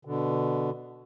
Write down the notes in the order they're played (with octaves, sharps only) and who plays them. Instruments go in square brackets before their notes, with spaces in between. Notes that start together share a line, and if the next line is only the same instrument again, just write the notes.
[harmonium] B2 D3